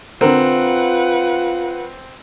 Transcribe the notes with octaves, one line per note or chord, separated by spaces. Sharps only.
D3 C4 F4 A#4 B4 F#5